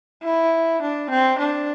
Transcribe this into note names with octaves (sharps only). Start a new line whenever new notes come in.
E4
D4
C4
D4